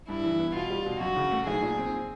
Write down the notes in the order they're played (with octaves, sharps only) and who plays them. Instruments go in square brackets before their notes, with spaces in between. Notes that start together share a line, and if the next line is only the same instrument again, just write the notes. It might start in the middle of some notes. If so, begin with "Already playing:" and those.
[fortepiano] G2 [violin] E4
[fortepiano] E3
B3
[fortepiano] B2 [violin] F4
[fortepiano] G3
B2
[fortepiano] F#2 [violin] F#4
[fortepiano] C#3
A3
[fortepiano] B1 [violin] G#4
[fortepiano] A#2
C4